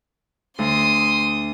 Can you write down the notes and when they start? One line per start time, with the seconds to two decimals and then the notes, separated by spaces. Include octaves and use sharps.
0.59 D2 C6 D#6